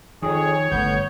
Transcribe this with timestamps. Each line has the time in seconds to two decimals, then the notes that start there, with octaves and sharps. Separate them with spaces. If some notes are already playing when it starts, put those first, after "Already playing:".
0.22 F2 D#3 G#4 C#5
0.71 G1 A#2 A3 B3 G6